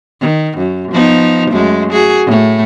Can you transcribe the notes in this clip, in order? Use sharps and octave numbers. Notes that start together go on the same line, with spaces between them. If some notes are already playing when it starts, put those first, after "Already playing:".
D#3
F#2
F3 B3 D#4
F#2 G#3 A3
F#4 G#4
A2 A3